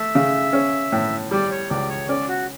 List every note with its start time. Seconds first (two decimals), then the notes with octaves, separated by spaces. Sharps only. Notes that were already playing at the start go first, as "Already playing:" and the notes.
Already playing: A3 E5
0.15 C#3
0.53 C#4
0.92 A2
1.31 G3 D5
1.51 C#5
1.70 C#2 D5
1.89 C#5
2.09 C#4 D5
2.28 F#4